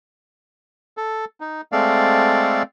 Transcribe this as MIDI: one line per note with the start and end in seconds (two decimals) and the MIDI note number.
0.97 1.25 69
1.40 1.61 63
1.72 2.63 56
1.72 2.63 57
1.72 2.63 60
1.72 2.63 69
1.72 2.63 74
1.72 2.63 77